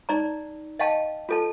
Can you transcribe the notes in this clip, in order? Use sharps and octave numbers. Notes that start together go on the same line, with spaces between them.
D#4 D5 A#5
D#5 F5 G5 A5
F4 A4 A5